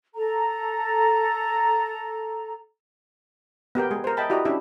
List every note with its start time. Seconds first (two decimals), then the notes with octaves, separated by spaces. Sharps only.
0.15 A4 A#5
3.75 B3 G4 A#4 G5
3.91 G#3 G#4
4.04 A#4 C5
4.17 D#5 E5 G5 A5 B5
4.30 E4 F#4 G4 D5 D#5 A#5
4.45 C#4 D4 E4 G4 E5